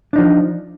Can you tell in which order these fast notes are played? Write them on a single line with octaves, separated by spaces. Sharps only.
D4 D#4 F3